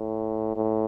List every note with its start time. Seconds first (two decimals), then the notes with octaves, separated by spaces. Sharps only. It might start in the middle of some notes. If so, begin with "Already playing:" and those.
Already playing: A2
0.56 A2